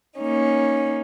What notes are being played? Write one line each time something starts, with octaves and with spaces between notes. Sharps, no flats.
A#3 C#4 D#4